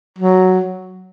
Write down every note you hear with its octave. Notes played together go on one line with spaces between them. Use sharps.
F#3